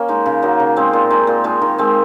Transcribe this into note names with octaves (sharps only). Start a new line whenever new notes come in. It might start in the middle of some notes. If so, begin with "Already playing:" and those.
Already playing: A#3 C#4
G#3 D#4
C#3
F#3 A#3 D#4
C#3
G#3 C4
A#2
G#3 D#4
A#2
F3 G#3 D#4
D#3
G#3 C4